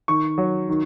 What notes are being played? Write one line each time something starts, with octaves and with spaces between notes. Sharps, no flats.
D#3 C#6
F#3
D#3